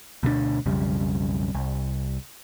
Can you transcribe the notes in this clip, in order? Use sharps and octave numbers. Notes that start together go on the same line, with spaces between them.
D2 B2 G3 D4
B1 F2 C#3 G3
C2